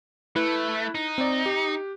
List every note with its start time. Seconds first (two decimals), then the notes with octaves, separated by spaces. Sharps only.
0.36 A3 E4 B4 F#6
0.95 D#4
1.18 C4 D5
1.46 G4